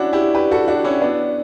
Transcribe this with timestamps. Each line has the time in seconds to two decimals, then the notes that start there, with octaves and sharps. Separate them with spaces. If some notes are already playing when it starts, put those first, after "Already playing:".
Already playing: C#4 D4 E4 F#4
0.13 E4 G4
0.35 G4 B4
0.51 F#4 A4
0.68 D4 F#4
0.84 C#4 E4
1.01 B3 D4